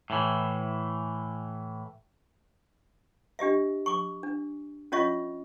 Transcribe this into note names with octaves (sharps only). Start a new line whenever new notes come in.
A2 E3
D4 G4 D#5 E5
C#6 D6
D4
C#4 F4 C#5 D#5 E5 C#6